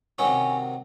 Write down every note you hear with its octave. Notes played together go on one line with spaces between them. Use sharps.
C3 D#3 F#3 C#4 C#5